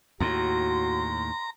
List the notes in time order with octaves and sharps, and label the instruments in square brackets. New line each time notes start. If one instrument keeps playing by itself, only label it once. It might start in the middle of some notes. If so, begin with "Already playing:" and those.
[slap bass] D#2 A2 [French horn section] F#4 [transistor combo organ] A#5 [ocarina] C6